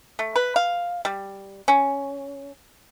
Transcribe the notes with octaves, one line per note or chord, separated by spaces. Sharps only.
A3
B4
F5
G3
C#4